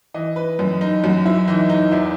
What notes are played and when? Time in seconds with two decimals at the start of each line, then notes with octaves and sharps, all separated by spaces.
0.14 E3 D#5
0.36 B4
0.59 F#2
0.81 D#4
1.04 F#2 F#4
1.26 E4
1.48 E3 D#4
1.70 D#4
1.92 E2 E4